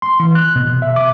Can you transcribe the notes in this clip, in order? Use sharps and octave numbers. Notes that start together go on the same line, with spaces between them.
C6
E3
F#6
B2
E5
D6